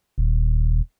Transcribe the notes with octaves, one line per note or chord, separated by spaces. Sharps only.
D#1